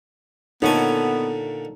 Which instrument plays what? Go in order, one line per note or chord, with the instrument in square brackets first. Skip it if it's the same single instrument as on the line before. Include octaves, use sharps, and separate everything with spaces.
[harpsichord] A#2 D3 G#5 [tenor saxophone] B3 [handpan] D#4 A4 C#5